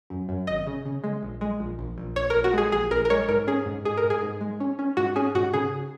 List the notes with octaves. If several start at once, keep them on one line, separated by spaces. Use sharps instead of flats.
F#2
F#2
G#1 D#5
C#3
C#3
G#3
A#1
G#3
A#1
A#1
A#1
A#1 C#5
A#4
A#1
F#4
G#3 G#4
A#1 G#4
A#1 A#4
A#4
G#3 C#5
G#2 A#4
C#4 G#4
G#2
G#2 G#4
A#4
G#2
G#4
G#2
G#3
C#4
C#4
G#2 F#4
C#4 G#4
G#2 F#4
C#3 G#4